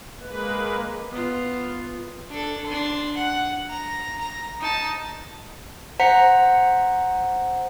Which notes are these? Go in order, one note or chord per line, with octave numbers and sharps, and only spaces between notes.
G#3 A#3 B4
B3 F4
D4 A4
D4 C6
F#5
A#5
A#5
D#4 A5
C5 F#5 A#5 B6 C#7